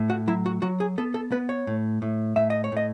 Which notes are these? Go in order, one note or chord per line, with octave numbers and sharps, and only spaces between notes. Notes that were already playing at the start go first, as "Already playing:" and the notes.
Already playing: A2
F#4
F#3 E4
F#4
F#3 F#4
G#4
B3 A4
A4
B3 B4
C#5
A2
A2
A2 E5
D#5
C#5
A2 D#5